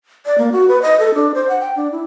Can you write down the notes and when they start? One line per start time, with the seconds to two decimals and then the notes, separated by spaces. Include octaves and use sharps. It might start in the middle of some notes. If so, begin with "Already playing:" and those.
0.26 D5
0.38 A#3
0.52 F#4
0.68 B4
0.82 D#5
1.00 A4
1.15 D4
1.34 C5
1.49 F#5
1.61 G5
1.76 D4
1.92 E4